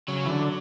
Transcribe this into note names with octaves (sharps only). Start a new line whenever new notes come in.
C#3 F#3
E3
D3